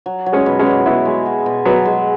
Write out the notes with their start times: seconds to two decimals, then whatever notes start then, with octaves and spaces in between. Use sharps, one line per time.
0.06 F#3
0.26 F#3
0.33 G#3 C#4
0.46 B2
0.59 G#3 C#4
0.66 B2
0.85 B3 E4 F#4
1.05 G#3
1.26 F#4
1.46 B2
1.65 F#3 B3 G#4
1.85 G#3